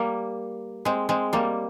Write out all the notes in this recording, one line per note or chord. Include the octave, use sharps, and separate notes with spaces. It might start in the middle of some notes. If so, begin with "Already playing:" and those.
Already playing: G3 A#3
G#3 C4
G#3 C4
G3 A#3